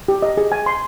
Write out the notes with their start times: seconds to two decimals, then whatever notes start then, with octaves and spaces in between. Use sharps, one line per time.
0.08 G4
0.22 D#5
0.37 G#4
0.52 G#5
0.66 C6